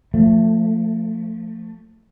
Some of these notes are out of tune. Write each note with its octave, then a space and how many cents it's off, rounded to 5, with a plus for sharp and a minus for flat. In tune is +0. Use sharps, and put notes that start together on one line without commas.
F3 +0 A3 +20